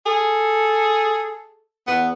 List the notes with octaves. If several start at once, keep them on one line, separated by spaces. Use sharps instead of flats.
G#4 A4
E2 B3